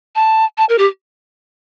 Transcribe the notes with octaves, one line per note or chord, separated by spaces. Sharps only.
A5
A5
A#4
G4